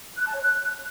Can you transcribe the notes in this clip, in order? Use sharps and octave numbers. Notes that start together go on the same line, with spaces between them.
F#6
A5
C#5
F#6